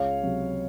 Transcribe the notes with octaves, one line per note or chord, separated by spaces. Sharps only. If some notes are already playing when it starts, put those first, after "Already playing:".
Already playing: C#2 C#5 F5
C3 F#3